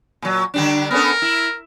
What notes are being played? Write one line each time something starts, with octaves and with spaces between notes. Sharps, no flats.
A#2 F#3
D3 G3 D4
B3 C#4 A4 A#4
E4